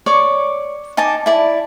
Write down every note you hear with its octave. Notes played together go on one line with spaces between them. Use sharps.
C#5 D5 C#6 D6
D#4 G#5 A5 D6
E4 D5 A5